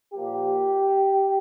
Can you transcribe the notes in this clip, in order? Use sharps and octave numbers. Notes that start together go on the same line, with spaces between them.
A#2 F3 A#3 G4